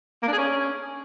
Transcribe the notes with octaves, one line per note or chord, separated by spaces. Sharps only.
A#3
D4
G#4
C#4